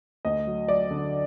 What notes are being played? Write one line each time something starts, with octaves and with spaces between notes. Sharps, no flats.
D2 D#5
F#3
F#3 D5
D3